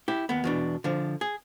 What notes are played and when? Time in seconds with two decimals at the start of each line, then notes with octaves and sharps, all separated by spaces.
0.08 E4 G4
0.29 D#2 B3
0.44 E2 B2 D4
0.84 D3 F3
1.21 G#4